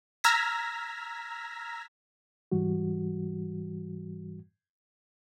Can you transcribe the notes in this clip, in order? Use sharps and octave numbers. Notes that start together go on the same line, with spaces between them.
A#5 E6 F6 G#6 A#6 B6
G#2 E3 G3 F#4